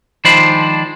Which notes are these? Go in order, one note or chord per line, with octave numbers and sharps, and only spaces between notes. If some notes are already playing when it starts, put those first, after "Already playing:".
D#3 F3 G#3 D4 C5 B5